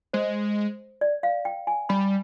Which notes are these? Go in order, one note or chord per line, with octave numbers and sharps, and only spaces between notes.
G#3 C5
D5
F5
G5
G#5
G3 B5